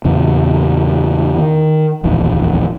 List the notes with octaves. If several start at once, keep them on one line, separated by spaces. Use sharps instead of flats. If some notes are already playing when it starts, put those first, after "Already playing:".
E2 A#2 C#3
D#3
D1 A#1 E2 D#3